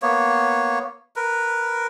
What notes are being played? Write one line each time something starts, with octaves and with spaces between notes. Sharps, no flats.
A#3 B3 C#5
A#4 B4